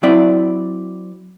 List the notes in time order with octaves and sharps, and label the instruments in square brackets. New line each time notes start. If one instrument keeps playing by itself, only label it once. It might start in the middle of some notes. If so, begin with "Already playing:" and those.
[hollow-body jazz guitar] F#3 C4 E4 D5